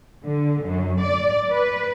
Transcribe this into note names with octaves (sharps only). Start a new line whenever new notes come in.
D3
F#2
D5
B4